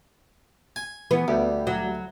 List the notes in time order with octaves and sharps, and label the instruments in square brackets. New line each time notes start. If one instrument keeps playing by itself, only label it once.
[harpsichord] G#5
[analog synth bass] E3 [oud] B3
[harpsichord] D2 [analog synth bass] G3
[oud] F#3